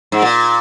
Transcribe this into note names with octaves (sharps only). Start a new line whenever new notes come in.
G#2
A#2